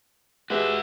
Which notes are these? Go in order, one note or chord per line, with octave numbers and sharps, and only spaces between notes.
G#3 F#4 G4 B4 E5